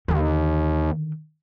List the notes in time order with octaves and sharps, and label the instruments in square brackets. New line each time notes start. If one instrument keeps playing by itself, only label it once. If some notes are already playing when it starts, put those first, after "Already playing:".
[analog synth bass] D#2 [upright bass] D3 D#3